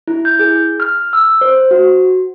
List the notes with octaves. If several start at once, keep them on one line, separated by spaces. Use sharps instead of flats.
E4
G6
G#4
F6
E6
C5
F#4